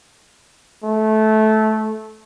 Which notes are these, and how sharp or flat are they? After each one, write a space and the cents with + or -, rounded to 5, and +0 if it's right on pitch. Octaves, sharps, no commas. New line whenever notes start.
A3 -15